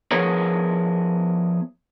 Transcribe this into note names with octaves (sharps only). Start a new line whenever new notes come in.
F3 B3 G#4 A#4 C#5 A#5